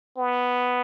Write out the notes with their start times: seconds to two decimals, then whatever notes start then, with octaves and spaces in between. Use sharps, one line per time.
0.18 B3